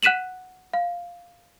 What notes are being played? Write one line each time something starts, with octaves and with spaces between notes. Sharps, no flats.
F#5 F#6 B6 D#7 E7 F#7
F5